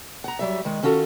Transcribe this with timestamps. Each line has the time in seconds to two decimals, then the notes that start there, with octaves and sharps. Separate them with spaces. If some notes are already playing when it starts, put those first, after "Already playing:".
0.24 F#5 A#5
0.39 F#3 G3 E5
0.65 D#3 G#3
0.83 D#3 C#4 F4 F#4 A4